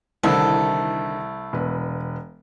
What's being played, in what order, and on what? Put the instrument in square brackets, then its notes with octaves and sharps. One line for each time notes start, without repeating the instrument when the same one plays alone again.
[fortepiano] C2 E6 [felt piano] D3 D#3 E4 [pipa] A3
[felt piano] E1 B4